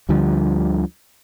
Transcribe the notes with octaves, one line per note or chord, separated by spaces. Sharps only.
D2 D3 F3 G3